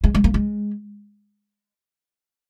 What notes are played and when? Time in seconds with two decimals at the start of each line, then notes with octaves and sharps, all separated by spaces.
0.04 G#3
0.15 G#3
0.24 A#3
0.34 G#3